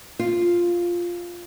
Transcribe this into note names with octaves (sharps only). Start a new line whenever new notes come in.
F4